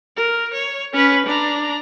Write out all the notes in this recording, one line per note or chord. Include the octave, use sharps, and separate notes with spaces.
A#4
C#5
C#4 B4
D4 A#5